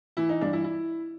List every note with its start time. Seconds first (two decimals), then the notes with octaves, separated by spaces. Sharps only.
0.17 E3 E4
0.29 D#4
0.41 G2 D4
0.53 E4
0.64 E4